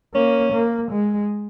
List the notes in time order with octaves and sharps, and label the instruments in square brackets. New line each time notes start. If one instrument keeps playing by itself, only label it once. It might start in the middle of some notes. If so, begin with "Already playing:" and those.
[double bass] A#3 [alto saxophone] C#4
[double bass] A#3
G#3